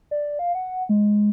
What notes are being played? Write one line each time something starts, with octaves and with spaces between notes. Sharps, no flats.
D5
F5
F#5
G#3